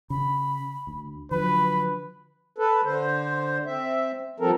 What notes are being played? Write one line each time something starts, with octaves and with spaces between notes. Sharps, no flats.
C#3 B5
D2
D3 F3 F#3 B4 B5
A4 B4
D3 C5
C4 E5
G2 F3 C4 A4 A#4